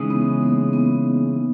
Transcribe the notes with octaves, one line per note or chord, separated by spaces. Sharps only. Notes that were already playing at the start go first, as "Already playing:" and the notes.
Already playing: C#3 E3 G#3 D#4
B3
A#3
B3